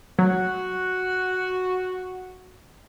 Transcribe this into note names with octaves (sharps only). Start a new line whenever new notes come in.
F#3 F#4